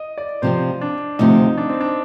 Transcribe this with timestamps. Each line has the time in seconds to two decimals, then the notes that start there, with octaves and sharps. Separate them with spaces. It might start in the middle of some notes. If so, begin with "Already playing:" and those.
Already playing: D#5
0.18 D5
0.42 C3 F3 C4 C5
0.81 D4
1.19 D2 C3 F3 D#4
1.58 D4
1.69 C4
1.81 D4